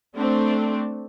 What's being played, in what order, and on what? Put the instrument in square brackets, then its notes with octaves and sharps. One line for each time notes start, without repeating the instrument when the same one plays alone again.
[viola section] A3 C4 D4